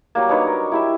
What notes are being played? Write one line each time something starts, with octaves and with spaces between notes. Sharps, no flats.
F#3 G3 A#3
D4 D#4 B4 C#5
A#4
E4 G4 E5